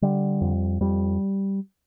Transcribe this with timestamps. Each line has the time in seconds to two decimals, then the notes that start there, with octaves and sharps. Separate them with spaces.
0.02 D3 G3
0.41 F2
0.81 F2 G3